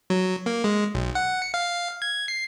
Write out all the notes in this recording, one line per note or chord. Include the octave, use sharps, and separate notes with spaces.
F#3
A#3
G#3
B1
F#5
C#7
F5
G#6
C7